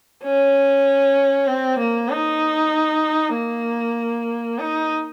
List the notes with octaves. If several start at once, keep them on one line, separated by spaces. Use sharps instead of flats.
C#4
C4
A#3
D#4
A#3
D#4